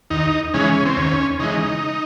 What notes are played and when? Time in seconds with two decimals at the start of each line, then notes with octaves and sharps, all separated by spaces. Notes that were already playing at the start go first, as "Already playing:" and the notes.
0.10 D#2 D#4
0.54 C#3 E3 G#3 C#4
0.86 C4
0.97 D#2 C#4
1.39 C#3 E3 G#3 D#4